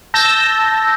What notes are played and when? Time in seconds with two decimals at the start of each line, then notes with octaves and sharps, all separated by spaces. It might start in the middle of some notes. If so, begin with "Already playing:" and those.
0.14 A5 E6 G6 A#6